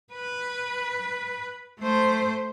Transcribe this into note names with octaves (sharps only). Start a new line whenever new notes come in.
B4
A3 C5